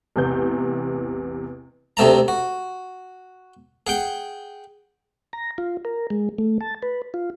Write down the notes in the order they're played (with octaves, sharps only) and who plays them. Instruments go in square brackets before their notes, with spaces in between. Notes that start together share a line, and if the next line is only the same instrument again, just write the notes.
[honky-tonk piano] A1 E2 C3 B3 G6
[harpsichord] D2 C3 A3 A5 A#5
F#4
G#4 F#5 G5
[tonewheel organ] A#5
F4
A#4
G#3
A3
A5
B4
F4